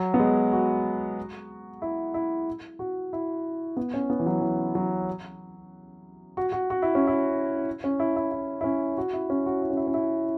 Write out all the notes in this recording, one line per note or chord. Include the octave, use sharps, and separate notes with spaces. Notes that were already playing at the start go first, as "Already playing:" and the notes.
Already playing: F#3
B3
G#3
F#4
E4
E4
F#4
E4
B3
C#4
B3
E3
F#3
E3
F#3
F#4
F#4
F#4
E4
C#4
E4
C#4
E4
E4
E4
E4
C#4
F#4
E4
C#4
F#4
E4
C#4
E4
C#4
E4